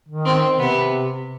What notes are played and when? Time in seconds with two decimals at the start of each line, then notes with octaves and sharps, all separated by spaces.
0.09 D#3
0.25 C4
0.59 C3 B3